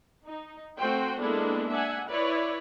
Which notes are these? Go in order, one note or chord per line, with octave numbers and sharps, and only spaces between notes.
D#4
A3 C4 F#4 C5 G5
G#3 A#3 B3 D4 E4 A4
D4 E5 F#5 G#5
E4 B4 C#5 D5